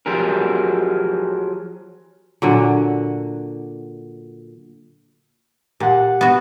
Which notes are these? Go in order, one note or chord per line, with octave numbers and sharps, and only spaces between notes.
F3 F#3 G4 G#4 A#4
A#2 D3 F#3
A#2 G4 F#5
B3 F#4